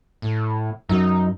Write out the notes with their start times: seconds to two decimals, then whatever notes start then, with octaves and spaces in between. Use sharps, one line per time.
0.22 A2
0.89 F#2 D#4